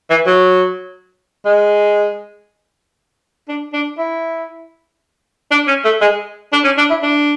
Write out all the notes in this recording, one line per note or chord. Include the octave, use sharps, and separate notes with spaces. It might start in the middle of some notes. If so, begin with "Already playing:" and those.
E3
F#3
G#3
D4
D4
E4
D4
C#4
A3
G#3
D4
C#4
D4
E4
D4